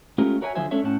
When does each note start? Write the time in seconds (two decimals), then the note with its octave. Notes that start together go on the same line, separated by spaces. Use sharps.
0.18 G#3 A3 C#4 F4 G4 A#4
0.41 F#4 A#4 C#5 E5 G5 G#5
0.55 D3 F3 F#3 C5 E5 G#5
0.71 G#3 C#4 D4 A4 C#5 E5
0.83 A2 C4 C#4 F#5 A5